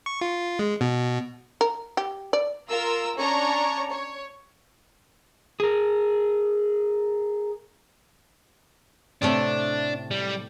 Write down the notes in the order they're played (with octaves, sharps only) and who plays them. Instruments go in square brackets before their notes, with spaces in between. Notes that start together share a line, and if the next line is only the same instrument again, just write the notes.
[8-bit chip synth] C#6
F4
G#3
B2
[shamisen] A#4
G4
D5
[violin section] F4 A#4 A#5 E6
C#4 D4 C#5 A#5
C#5
[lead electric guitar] G#4 A#4
[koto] A2 C3 A3 [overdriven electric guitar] D4
[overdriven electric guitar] G3